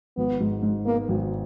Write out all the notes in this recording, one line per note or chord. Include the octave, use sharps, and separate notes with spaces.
G#1 B3
G#2
G#2
A#3 B3
G#1